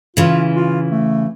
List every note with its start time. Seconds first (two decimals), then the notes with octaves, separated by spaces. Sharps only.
0.17 C#3 E3 F4
0.56 F4
0.92 A3